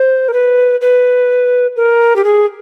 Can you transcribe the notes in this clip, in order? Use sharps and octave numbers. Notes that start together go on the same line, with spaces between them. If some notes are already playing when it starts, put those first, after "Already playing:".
Already playing: C5
A#4
B4
B4
A#4
G4
G#4